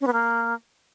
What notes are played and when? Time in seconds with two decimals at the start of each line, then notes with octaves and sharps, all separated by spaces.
0.01 C#4
0.07 B3
0.13 A#3